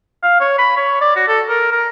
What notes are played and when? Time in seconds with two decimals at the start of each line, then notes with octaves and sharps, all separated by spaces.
0.23 F5
0.41 C#5
0.58 B5
0.76 C#5
1.01 D5
1.16 F#4
1.28 A4
1.49 A#4
1.72 A#4